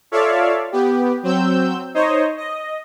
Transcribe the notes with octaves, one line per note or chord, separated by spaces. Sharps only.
F4 A4 C#5 D5 E5 F5
B3 G4
F#3 C4 E6 G6
D#4 C5 C#5 D#5
D#5